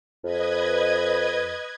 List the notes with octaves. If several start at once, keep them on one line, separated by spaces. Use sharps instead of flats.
F2 B4 D#5 G#6